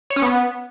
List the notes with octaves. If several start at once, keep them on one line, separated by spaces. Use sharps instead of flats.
C#5
C#4
B3